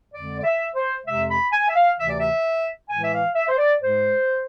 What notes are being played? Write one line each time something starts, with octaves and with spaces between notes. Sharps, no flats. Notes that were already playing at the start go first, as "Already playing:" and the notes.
F2 D3 G#3 D5
D5
E5
C5
F2 C3 G#3 E5
B5
G#5
E5
F5
D2 C3 E3 E5
D5
E5
A2 E3 G#3 G#5
E5
F5
E5
C5
D5
G#2 G#3 C5